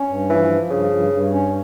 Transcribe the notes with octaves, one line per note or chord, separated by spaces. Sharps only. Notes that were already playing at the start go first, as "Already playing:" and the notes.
Already playing: C#4
G2
E3 F3
F3
G2 C#3
G2
G2
C#4